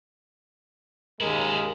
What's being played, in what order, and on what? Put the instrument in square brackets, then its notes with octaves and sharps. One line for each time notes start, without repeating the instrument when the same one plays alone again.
[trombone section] D#2 G#3 A#4 [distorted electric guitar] C#4 E4